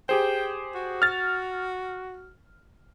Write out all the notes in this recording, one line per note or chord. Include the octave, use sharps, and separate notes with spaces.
G4 G#4 C5 G5
F#4
F6 A6